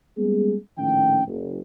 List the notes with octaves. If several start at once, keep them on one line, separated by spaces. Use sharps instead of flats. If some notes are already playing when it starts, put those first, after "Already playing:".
G3 G#3 A#3 B3 C#4 G#4
A#1 A2 D#3 C#4 G5
F#1